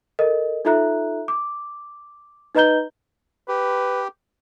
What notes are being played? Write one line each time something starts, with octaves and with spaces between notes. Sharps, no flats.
A4 A#4 D#5
D#4 F4 A4 E5 A#5 F#6
D6
D#4 B4 D#5 A#5 G6 G7
G4 B4